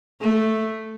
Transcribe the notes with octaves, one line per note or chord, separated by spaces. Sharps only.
A3